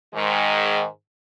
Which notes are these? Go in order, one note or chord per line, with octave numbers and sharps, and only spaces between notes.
G#2 D#3 G#3